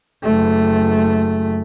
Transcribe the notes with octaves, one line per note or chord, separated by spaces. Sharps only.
F#1 A3